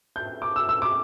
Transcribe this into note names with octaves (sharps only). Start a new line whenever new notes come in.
G6
D6
E6
E6
D6